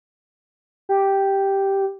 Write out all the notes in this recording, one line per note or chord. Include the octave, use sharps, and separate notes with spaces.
G4